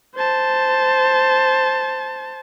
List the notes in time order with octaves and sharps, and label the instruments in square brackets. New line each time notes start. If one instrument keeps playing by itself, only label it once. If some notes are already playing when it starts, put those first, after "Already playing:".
[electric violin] C5 A5